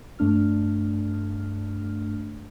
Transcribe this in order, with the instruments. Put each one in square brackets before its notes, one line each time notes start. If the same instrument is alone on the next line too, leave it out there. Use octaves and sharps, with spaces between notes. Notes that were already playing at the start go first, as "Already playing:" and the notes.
[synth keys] G2 A3 D4 F6